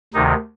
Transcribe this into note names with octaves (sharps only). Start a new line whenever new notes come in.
D2 C3 D#3 D#4